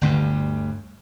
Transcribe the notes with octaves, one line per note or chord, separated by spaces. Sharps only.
G1 D2 G2